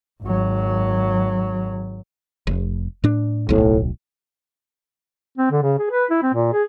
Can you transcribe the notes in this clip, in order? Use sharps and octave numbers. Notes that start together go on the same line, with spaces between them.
G#1 F#3
F1
A2 D4
D1 B1 A2
C4
D3
C#3
G#4
B4
E4
C4
A#2
G#4